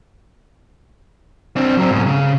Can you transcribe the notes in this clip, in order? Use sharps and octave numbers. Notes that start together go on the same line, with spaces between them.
C4 D4
F#3 C4
G#2 B2
C#3